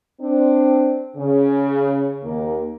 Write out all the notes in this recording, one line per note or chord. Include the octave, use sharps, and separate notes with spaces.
C4 D4
C#3
D#2 A#3